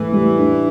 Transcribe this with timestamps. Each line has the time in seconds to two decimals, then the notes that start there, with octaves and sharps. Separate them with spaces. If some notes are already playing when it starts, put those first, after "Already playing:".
Already playing: A2 E3
0.13 G3
0.38 D4